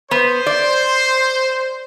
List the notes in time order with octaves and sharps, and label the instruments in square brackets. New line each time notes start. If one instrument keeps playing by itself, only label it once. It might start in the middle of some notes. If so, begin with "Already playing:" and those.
[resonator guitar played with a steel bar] B3 [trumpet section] C5
[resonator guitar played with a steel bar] D5